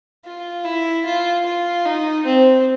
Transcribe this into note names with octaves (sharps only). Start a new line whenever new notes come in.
F4
E4
F4
F4
D#4
C4